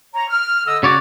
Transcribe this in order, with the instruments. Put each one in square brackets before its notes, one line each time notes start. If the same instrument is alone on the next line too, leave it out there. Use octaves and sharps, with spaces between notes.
[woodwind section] C#5 A#5
F6
D3 D#5 E6
[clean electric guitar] C#3 C#5 D5 [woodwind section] F#4